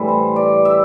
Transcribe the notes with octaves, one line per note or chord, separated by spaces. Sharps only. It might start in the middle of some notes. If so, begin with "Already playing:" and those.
Already playing: A2 E3 G3
C5
D5
E5